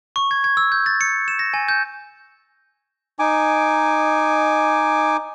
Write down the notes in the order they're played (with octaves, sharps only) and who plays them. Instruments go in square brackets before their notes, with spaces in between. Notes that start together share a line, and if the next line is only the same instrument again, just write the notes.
[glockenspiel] C#6
G#6
G#6
E6
G6
A6
C#7
E7
A#6
G#5
G6
[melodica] D#4 G#5 D6